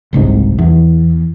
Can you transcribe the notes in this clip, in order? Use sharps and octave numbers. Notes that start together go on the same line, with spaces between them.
F#1 C2 G#2 C3
E2